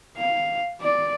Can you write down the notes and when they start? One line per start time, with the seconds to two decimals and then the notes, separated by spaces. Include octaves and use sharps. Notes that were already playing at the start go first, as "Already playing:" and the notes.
0.17 F5
0.81 D5